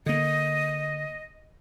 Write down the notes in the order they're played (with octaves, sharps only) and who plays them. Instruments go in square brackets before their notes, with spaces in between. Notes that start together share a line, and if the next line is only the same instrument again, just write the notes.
[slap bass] D3 A#3 [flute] D#5